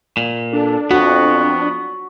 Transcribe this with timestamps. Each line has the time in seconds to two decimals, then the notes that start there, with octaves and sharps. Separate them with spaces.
0.17 A#2
0.53 D4 A4
0.91 F2 B3 F#4